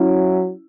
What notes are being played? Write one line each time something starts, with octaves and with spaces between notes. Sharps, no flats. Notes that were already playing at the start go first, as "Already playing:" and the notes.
Already playing: F#3 C#4 E4